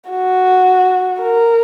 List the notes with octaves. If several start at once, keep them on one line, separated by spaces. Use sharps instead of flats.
F#4
A#4